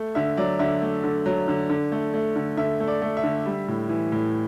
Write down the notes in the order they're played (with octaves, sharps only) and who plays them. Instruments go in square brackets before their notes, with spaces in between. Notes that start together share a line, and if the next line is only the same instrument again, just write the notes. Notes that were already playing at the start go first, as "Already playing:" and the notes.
Already playing: [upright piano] A3
D3 E5
F#3 D5
D3 E5
A3
D3
F#3
D3
D3
A3
A3
D3
D3 E5
A3
D5
A3
E5
D3
G3
A2
E3
A2